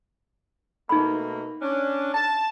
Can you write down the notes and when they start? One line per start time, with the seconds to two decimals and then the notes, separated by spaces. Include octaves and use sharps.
0.89 B2 A3 A#3 D#4 B5
1.61 C#4 D4
2.13 A5